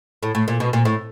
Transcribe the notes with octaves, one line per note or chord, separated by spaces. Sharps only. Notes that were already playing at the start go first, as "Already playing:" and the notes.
A2
A2
A#2
B2
A#2
A2